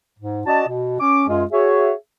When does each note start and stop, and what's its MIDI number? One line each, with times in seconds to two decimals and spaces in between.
0.19 0.41 44
0.46 0.63 61
0.46 0.63 66
0.46 0.63 74
0.46 0.63 75
0.46 0.63 81
0.67 0.97 47
1.00 1.23 61
1.00 1.23 86
1.28 1.43 42
1.28 1.43 56
1.28 1.43 65
1.28 1.43 68
1.51 1.91 66
1.51 1.91 68
1.51 1.91 73
1.51 1.91 76